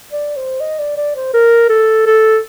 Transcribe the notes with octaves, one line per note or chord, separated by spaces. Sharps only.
D5
C5
D#5
D5
D5
C5
A#4
A4
A4